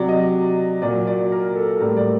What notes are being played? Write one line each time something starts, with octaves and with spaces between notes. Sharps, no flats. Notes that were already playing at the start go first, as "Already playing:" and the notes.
Already playing: C3 F#3 D5
D#5
A#2 F#3 D5
D5
A#4
A4
A2 G3 A#4
D5